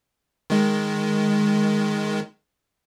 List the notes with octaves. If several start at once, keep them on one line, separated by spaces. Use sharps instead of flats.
D#3 G#3